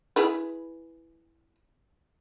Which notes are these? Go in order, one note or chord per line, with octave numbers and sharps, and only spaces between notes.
E4 G#4 B4